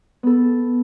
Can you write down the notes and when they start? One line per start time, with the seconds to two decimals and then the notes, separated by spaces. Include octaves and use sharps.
0.23 B3 A4